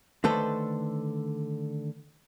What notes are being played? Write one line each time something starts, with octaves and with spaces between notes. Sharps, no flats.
D3 D#3 A3 A4 B4 C5